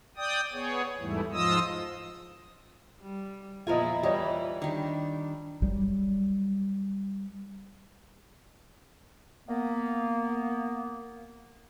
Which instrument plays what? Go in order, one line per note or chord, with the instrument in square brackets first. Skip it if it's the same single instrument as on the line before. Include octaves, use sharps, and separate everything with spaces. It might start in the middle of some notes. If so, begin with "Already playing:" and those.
[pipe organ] D5 G5 D#6
B3 G#4 C#5
E2 G#2 E3 G3 A3 E4
G#2 F3 F4 D#5 D#6 E6
[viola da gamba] G3
[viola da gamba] E2 A#2 E4 [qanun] F3 A#4 G#5 [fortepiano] F4 D#5
[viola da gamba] E3 [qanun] G3 [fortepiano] C#5 D#5
[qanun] D#3 G3 [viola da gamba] D4
[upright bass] F#3 G3
[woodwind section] A#3 B3